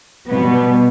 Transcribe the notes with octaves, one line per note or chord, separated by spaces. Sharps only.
B2 G3 B3